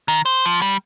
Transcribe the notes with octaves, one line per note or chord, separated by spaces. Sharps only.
D#3
C5
F3
G3